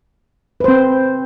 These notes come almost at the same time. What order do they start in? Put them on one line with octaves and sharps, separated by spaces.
B4 C5 C4